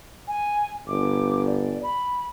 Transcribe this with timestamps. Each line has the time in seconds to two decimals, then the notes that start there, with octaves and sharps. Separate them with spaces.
0.28 G#5
0.88 G1 D6
1.47 D5
1.83 B5